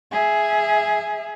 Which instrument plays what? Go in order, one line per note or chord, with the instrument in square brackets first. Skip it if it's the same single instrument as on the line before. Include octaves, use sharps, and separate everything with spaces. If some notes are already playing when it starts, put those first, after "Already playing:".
[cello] G#4 E5